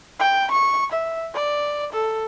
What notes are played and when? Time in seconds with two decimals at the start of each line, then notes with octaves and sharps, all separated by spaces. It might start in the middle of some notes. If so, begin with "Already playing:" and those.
0.20 G5
0.51 C#6
0.92 E5
1.34 D5
1.92 A4